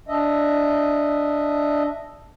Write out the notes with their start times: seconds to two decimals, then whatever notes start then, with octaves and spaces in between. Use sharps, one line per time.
0.08 D4 D#5 E5